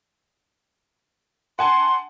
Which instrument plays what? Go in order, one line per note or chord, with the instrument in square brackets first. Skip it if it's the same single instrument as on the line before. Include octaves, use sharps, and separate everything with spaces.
[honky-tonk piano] F#5 G#5 A5 [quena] C6